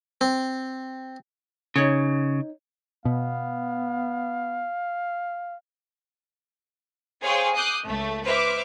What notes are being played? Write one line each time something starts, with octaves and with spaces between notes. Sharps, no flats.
C4
C#3 D#4 C#5
B2 B3 F5
G#4 C5 C#5 F5 G5 C6
D6 D#6 F#6 G6 C7
C#2 A3
B4 C5 E5 D6 F6